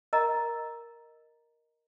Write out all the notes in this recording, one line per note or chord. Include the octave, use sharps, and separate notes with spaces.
A#4 D#5 A#5